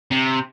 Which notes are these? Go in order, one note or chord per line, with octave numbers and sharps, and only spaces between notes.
C3